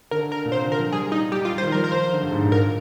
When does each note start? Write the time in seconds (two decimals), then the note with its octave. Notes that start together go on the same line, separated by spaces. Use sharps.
0.11 D3 A#4
0.32 A#4
0.45 A#2
0.51 C3 C5
0.65 D3
0.72 A#4
0.79 F3
0.92 G3 G#4
1.12 D#4
1.32 G3 G4
1.42 G3
1.45 F4
1.52 G3
1.58 C5
1.63 D#3
1.72 F3 A#4
1.84 A#4
1.92 F3 C5
2.13 D3
2.22 G2
2.32 G#2
2.42 A#2
2.52 A#4